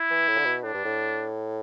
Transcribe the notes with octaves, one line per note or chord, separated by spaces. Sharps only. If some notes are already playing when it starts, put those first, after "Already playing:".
Already playing: E4
E3
A2
D3
B2
A2 D4
G2
A2